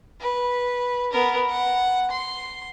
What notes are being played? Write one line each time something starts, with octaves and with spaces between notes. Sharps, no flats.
B4
B3 A#4
F#5
C6